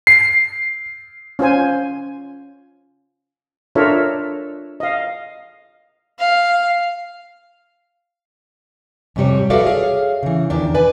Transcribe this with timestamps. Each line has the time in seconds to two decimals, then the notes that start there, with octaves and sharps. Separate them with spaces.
0.07 C7
1.39 C#4 F4 C5 G#5
3.75 D4 F4 A4 A#4 C#5 E5
4.80 D#5 F5
6.19 F5
9.16 F2 G#2 C3 G3 C#5
9.50 F#4 A4 B4 D5 E5 F5
9.66 G#4 C#5 F5
10.23 C#3 E3
10.50 E2 D#3 D4
10.75 B4 D5 G#5